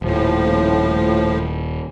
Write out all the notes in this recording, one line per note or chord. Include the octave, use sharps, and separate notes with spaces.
D#1 A2 F3